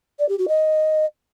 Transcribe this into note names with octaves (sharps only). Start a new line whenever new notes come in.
D5
G4
F#4
D#5